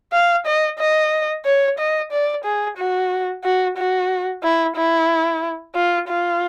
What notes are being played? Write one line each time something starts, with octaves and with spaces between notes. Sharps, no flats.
F5
D#5
D#5
C#5
D#5
D5
G#4
F#4
F#4
F#4
E4
E4
F4
F4